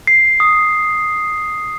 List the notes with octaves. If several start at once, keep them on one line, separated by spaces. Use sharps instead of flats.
C7
D#6